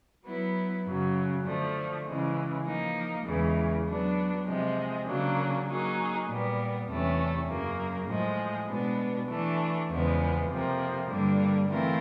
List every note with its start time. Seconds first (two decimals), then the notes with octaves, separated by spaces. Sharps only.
0.24 F#3 B3 E4
0.85 F#2 C#3 F#3
1.45 D3 F3 A3
2.05 C#3 E3 G#3
2.66 F3 A#3 D#4
3.26 E2 C#3 E3 G#3
3.86 F#3 B3 D4
4.46 C3 F3 G#3
5.07 C#3 F#3 A#3 D4
5.67 F#3 A#3 D#4 G#4
6.27 A#2 G3 B3
6.87 E2 C3 E3 A3 C#4
7.47 F#2 C#3 F#3 A#3
8.07 A2 F3 G#3
8.68 B2 G#3 B3 D4
9.28 E3 A3 D4
9.89 E2 C#3 F3 G#3 B3
10.49 F2 C3 F3 A#3
11.09 G2 D3 G3 A#3 D4
11.69 E3 A3 C4 F4 A#4